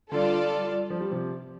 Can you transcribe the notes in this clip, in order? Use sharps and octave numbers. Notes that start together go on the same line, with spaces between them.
D3 G3 F4 A4 D5
F3
G3
C3 F3